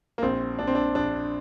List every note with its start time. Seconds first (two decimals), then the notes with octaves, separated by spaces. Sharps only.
0.18 A#3
0.22 A#1 C4
0.59 A#1 D4
0.67 C4
0.75 D4
0.95 A#1 D4